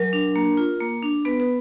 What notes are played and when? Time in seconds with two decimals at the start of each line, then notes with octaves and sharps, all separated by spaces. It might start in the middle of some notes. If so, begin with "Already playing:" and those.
Already playing: F#3 A#4
0.13 D4
0.36 A#3
0.57 F4
0.80 A#3
1.03 D4
1.25 B3 B4
1.40 B4